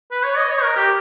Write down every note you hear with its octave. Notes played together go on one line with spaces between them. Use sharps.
B4
C#5
D#5
C#5
A#4
G4